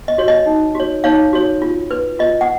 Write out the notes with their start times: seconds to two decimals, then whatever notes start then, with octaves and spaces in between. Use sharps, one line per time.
0.08 D#5
0.18 F#4 C#5
0.28 D#5
0.46 D#4
0.75 F#4 C#5
1.04 D#4 C#5 F5
1.33 F#4 C#5
1.62 F4
1.91 B4
2.19 F4 D#5
2.41 F#5